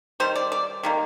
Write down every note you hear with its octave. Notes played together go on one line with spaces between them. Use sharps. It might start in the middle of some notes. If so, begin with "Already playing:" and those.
D#3 G3 C5
D5
D5
D#3 G3 A#3